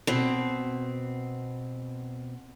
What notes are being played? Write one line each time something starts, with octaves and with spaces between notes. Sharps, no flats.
B2 C4